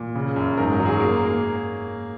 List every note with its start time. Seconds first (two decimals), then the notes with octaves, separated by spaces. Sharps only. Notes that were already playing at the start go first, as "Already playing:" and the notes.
Already playing: A#2
0.15 C#3
0.36 F#2
0.57 G#2 A#4
0.72 A#4
0.79 F#3
0.86 G#4
1.00 A#3
1.22 A#3